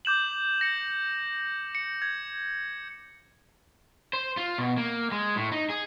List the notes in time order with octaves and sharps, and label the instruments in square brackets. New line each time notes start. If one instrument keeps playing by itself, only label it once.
[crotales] D6 G6 E7 F#7
A#6 C#7
C#7
G#6
[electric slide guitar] C5
F4
B2
A#3
G#3
A2
D#4
G#4